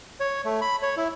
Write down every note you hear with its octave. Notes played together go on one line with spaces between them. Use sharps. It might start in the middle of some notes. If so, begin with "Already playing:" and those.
C#5
A3
B5
C#5
E4